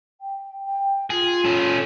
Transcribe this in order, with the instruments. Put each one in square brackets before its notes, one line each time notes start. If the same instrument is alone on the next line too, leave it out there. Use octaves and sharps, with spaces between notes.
[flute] G5
G5
[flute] F4 [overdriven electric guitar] G#4
[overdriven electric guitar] C#4 A4